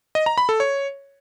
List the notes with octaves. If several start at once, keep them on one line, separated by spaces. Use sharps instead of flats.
D#5
A#5
B5
A4
C#5